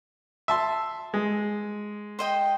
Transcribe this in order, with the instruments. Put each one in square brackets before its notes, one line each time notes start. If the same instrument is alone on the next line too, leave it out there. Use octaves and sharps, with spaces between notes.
[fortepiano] E5 A5 C6
G#3
[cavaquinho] C5 D#5 G5